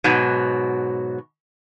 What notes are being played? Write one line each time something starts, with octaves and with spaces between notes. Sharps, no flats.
G#2 B2 F#3